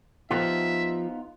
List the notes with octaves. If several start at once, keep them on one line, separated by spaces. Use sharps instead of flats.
F3 B3 D#4 F4 G4 E5